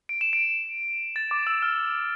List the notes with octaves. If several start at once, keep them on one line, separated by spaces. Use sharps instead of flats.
D7
E7
D7
A6
D6
E6
F6